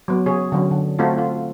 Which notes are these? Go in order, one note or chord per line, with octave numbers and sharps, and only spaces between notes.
F#3 B3
C#3 G#4 C#5
D3 F#3 C#4
D3
A3 C4 F4 F#4 A4
F4